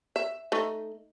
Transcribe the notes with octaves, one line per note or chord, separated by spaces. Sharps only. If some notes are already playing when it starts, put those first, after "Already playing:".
E5
A3 D#4